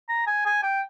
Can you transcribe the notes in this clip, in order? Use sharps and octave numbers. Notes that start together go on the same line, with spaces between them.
A#5
G#5
G#5
G5